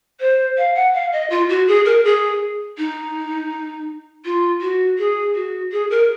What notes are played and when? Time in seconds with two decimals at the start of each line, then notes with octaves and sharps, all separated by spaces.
0.20 C5
0.57 F5
0.75 F#5
0.93 F5
1.12 D#5
1.30 F4
1.49 F#4
1.68 G#4
1.85 A#4
2.04 G#4
2.78 D#4
4.25 F4
4.61 F#4
4.98 G#4
5.35 F#4
5.72 G#4
5.90 A#4